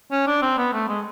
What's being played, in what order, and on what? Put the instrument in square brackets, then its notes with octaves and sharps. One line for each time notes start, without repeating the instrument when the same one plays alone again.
[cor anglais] C#4
D4
C4
B3
A3
G#3